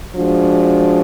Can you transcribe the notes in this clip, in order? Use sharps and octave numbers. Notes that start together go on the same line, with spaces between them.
F3 G#3 D4 F#4